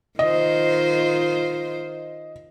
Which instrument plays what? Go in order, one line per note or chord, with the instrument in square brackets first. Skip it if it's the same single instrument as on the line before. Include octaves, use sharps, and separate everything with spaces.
[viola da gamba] D#3 F4 C5 [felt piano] D#5